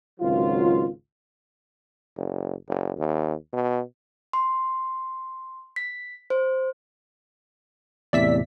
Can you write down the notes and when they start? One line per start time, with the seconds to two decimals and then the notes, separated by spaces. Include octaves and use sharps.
0.20 G#1 C#2 F#3 F4
2.16 F#1
2.68 F#1
2.97 D#2
3.53 B2
4.33 C6
5.76 B6
6.30 C5
8.13 E2 A2 C3 D5 E5 B6